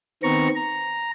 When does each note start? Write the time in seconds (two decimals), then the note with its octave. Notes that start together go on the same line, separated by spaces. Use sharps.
0.23 D#3 B3 C4 A#5 C#6
0.55 A#5